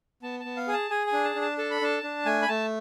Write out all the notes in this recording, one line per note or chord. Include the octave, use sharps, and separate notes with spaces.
B3 A5
A5
B3
F5
G#4 G#5
A5
G#4 G#5
G#5
D4
A5
D4
A5
A4 A5
B5
D4 A5
D4
A3 G#5
B5
A3 A5